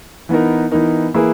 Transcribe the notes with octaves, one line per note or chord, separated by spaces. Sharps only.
E3 B3 D#4 A#4
E3 B3 D#4 A#4
E3 A#3 E4 G#4 B4